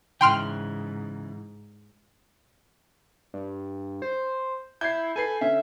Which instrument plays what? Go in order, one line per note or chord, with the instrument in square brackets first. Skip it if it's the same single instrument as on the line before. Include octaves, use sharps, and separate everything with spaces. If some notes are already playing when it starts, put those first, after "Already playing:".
[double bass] G#2 [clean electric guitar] C#3 E3 [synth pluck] G5 C6 F6
[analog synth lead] G2
C5
[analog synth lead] E4 [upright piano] G6 G#6 C7
[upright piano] A4 B4 C7 [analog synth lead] G#5
[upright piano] D3 C#4 [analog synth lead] E5